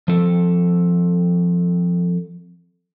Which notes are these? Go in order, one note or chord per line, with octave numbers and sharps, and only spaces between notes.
F3 C4 A4